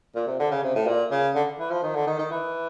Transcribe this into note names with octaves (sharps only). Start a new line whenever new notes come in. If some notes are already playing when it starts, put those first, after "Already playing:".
A#2
C3
D3
C#3
C3
A2
A#2
C#3
D3
E3
F3
D#3
D3
D#3
D#3
E3